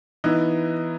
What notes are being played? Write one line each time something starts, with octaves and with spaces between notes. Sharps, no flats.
E3 B3 D#4